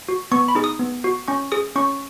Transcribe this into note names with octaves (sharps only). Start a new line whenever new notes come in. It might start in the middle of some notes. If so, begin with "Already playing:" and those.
F#4
B3 C#6
B5
D#4 G#4
D#6
B3
F#4
C#4 C#6
G#4 D#6
C#4 C#6